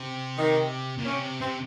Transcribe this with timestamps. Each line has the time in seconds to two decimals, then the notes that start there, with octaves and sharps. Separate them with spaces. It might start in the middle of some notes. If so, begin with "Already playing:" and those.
Already playing: C3
0.38 D#3
0.98 A#2
1.06 C3 C#4
1.41 C3 C4